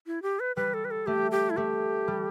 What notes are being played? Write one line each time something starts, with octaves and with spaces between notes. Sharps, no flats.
E4
G4
B4
G3 B4
A4
B4
A4
A3 G4
G4
E4
A3 G4
G3